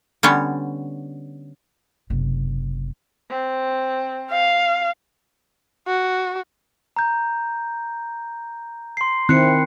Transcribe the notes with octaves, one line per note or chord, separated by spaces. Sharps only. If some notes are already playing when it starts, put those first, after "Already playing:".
D3 G3 B3 C#4
F#1 C3
C4
F5
F#4
A#5 G6
C6 C7
D#3 C4 E4 F#6 C7 C#7